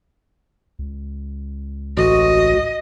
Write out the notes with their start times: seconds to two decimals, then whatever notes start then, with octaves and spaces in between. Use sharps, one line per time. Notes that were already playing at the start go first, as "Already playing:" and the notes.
0.79 C#2
1.97 A1 F#4 D#5